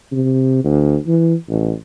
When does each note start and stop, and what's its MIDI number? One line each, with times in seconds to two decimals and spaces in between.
0.13 0.63 48
0.64 0.96 38
1.07 1.35 52
1.50 1.73 33